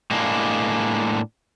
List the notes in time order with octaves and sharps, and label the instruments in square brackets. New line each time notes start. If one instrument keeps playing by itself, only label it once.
[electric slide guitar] A2 G#3 A#3 D4